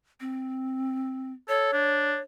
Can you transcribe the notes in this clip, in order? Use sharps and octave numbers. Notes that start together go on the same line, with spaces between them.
C4
A4 C#5
D4